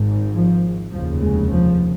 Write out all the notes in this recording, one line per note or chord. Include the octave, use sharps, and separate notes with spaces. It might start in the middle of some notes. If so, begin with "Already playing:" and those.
Already playing: G#1 G#2
F3
F1 D#2 C#3 F3
G#3
F3